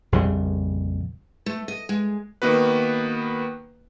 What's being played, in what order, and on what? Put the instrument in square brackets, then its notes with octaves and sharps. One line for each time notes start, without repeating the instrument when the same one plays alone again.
[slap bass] A#1 F2 C#3 G3
[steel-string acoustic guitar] A3
D#5
G#3
[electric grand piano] D#3 A#3 B3 F#4 B4